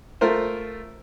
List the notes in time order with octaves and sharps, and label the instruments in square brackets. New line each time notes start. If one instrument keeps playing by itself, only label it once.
[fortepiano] A3 F4 A#4 C5